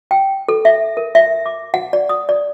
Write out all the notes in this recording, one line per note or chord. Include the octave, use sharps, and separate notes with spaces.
G5
A4
E5
A#4
E5
D6
F#5
D5
D#6
D5